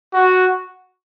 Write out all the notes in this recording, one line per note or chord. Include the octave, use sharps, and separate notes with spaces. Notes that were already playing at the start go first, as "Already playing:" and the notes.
F#4